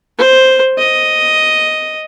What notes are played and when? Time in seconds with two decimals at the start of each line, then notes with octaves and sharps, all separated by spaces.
0.18 C5
0.78 D#5